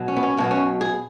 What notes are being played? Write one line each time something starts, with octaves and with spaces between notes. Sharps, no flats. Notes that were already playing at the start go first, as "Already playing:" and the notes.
Already playing: B1 B2 F#3
C#4
B3
C#4
B1 B2 F#3
C#4
G#4